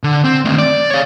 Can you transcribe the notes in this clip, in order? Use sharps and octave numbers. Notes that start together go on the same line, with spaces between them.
D3
C4
D#3 A3
D5
C#5 F5